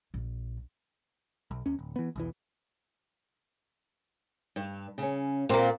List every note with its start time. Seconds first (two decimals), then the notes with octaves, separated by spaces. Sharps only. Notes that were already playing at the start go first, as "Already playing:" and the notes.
0.14 A#1
1.51 B1
1.66 D#2 C#4
1.79 D1
1.96 E3 B3
2.16 B1 E2 E3
4.56 G2
4.98 C#3 C#4
5.49 A#2 A#3 C4